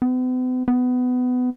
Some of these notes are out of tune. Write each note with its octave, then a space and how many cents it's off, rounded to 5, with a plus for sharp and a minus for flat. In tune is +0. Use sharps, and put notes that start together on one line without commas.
B3 +45
B3 +20